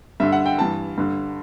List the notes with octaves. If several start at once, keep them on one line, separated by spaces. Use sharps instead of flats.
G2 D3 E5
F#5
G5
G2 E3 A5
G2 D3